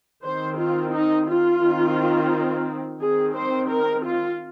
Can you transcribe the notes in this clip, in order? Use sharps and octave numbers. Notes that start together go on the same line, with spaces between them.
D#3 C4 C5
F4
D#4
F4
D#3 C4
D#3 C4 G#4
C5
A#4
F4